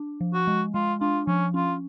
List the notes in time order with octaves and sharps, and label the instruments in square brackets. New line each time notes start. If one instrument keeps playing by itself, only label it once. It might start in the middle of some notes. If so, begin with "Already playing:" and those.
Already playing: [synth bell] D4
F3
[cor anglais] F#4
[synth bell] G#3
[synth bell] G#3 [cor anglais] F4
[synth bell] D4 [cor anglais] F4
[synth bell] F3 [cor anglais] C#4
[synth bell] C#4 [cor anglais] F4